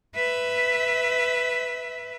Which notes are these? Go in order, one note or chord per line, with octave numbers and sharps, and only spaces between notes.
B4 E5